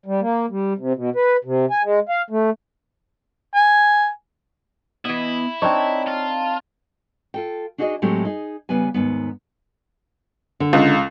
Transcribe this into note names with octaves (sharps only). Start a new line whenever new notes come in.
G3
A#3
G3
C3
B2
B4
C3
G#5
G#3
F5
A3
G#5
E3 B3 E4 D#5
C4 D4 D#4 C#5 A5
F4
F4 A4 G5
D4 D#4 F#4 G#4 B4 D#5
A2 F#3 G#3 A3 C4 G4
D#4 G#4
C#3 G3 B3 B4 G#5
D#2 G#2 B3
D3
C#2